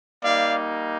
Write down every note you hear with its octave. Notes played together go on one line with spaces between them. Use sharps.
G3 A#3 D#4 D5 F5